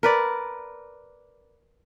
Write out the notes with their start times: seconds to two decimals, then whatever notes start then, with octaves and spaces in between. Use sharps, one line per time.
0.03 A#4 B4 D5